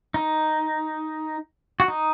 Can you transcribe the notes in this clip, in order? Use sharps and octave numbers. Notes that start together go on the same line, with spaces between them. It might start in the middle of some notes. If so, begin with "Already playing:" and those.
D#4
F#4
D#4